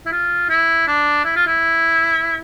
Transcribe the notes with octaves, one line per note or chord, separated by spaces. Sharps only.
E4
F4
E4
D4
E4
F4
E4